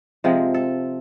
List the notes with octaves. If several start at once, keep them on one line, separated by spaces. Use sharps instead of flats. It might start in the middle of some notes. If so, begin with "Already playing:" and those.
C3 F3 G#3
A4